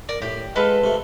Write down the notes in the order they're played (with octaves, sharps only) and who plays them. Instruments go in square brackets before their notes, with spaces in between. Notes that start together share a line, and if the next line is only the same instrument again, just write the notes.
[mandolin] A#4 [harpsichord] D5
[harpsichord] A2 [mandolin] G4
[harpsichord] G#3 [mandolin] F4 A4 B4
[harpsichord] C3 A3